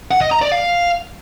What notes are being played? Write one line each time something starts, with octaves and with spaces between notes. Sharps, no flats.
F#5
D#5
A#5
D5
F5